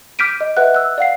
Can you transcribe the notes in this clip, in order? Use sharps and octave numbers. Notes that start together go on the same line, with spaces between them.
D6 F6 G6 B6 D7 D#7
D#5
B4 D#5 E5 F#5 F#6
E6 F#6
D5 F5 F#5 C7